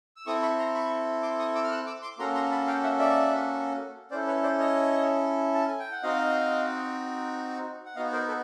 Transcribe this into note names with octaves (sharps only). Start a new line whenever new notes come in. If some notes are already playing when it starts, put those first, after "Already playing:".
E6
C4 E4 A4 C#6 D#6
B5 C#6
A#5 C6
B5 C#6
C6 D6
C#6 D#6
D6 E6
F6
E6 F#6
D6 E6
C6 D6
A#3 C#4 F#4 A4 A#5 C6
A#5 C6
A5 B5
F5 G5
E5 F#5
D5 E5
C#4 E4 A4 C5 D5
B4 C#5
C5 D5
C#5 D#5
A5
G#5
G5
F#5
C4 D#4 F#4 D#5 F5
F#5
B3 D#4 F#4 D#5 F5
A#4 C5
A4 B4